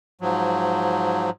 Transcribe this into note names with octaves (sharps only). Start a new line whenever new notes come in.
G#2 F3 F#3